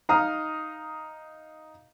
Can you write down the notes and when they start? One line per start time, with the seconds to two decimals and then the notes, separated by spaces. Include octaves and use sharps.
0.09 D#4 F5 A#5 D#6